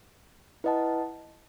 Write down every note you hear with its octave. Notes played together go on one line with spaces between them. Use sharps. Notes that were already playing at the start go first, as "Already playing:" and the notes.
E4 B4 D#5 F#5 A5